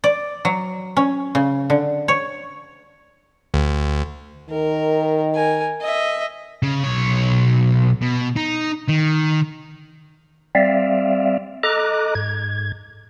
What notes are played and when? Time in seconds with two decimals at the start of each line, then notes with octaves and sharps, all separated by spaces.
0.04 D5
0.45 F#3
0.97 C#4
1.35 C#3
1.70 D3
2.08 C#5
3.54 D2
4.50 D#3 A#4
5.34 A#4 G#5
5.81 D#5 E5
6.62 C#3
6.84 B1 C#5
8.02 B2
8.36 D#4
8.88 D#3
10.55 G3 C4 D5 E5 F5
11.63 A4 D#5 A#5 D6 F#6
12.15 G#2 G#6